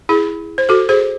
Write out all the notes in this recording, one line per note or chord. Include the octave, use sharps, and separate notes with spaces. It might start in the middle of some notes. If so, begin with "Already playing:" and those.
E4 G#4
C5
F#4 A4
G#4 C5